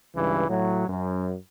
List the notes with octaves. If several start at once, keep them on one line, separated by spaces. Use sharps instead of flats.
C#2 G2 E3
A2 F#3
F#2